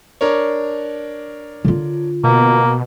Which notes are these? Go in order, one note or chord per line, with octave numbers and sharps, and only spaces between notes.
D4 A#4 C#5
D3 F4
B2 A#3